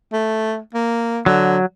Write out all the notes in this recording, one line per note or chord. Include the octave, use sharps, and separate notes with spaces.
A3
A#3
D3 F#3